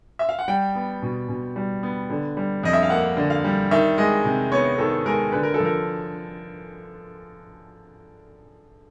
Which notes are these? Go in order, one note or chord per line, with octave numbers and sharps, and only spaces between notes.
E5
F5
F#5
G3 G5
B3
B2
B2
G3
B3
D3
G3
F2 D#5
E5
F5
A#3 F#5
D3
F5
G3
D#3 E5
G#3 D#5
C3
B3 C#5
D#3 A4
G#3 A#4
D3 B4
A#4
A4
F3 A#4